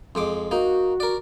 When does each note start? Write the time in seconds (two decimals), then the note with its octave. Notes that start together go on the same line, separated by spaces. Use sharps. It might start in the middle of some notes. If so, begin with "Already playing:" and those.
0.15 F2 G#3 D6
0.51 A#3 D#4 F#4
1.00 A#4 D5